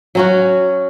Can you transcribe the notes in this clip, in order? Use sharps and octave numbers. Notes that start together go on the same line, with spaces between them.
F#3 C#4 F#4